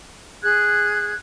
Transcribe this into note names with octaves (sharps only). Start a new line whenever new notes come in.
G#4 F#6 G#6